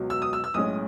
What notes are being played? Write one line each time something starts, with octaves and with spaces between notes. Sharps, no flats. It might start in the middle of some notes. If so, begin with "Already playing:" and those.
Already playing: C#2 B2 F#3
E6
D#6
E6
E6
B1 A2 G#3 C#4 D#6